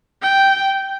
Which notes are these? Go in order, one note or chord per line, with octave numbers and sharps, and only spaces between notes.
G5